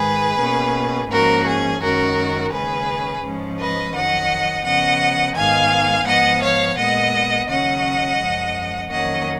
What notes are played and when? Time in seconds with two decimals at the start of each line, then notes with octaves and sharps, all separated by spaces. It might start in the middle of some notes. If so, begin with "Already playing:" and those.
Already playing: G#2 D#3 G#3 G#4 B4
0.39 B2 A#3 C#4
1.10 G#2 F3 A#3 C#4 F#4 A#4
1.46 G#4
1.81 F#2 D#3 G#3 C#4 F#4 A#4
2.52 D#2 C#3 G#3 C#4 G#4 B4
3.23 G#2 F3 G#3 C#4
3.59 B4 D#5
3.94 F2 D#3 F#3 D#5 F#5
4.65 C#3 F3 B3 D#5 F#5
5.36 G#2 D#3 G#3 B3 F5 G#5
6.07 G#2 F3 B3 D#5 F#5
6.42 C#5 F5
6.77 A#2 G#3 B3 D#5 F#5
7.49 D#2 C#3 F#3 C#4 D#5 F#5
8.20 F#2 F3 G#3
8.90 F2 D#3 F#3 A#3 C#4 D#5 F#5